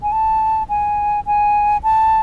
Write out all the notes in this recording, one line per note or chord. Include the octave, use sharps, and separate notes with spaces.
G#5
A5
G#5
G#5
A5